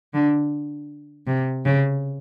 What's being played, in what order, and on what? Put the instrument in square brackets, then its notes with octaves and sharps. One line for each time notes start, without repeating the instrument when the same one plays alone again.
[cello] D3
C3
C#3